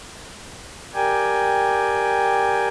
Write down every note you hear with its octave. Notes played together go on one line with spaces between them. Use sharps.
G4 A#4 D5 G5 G#5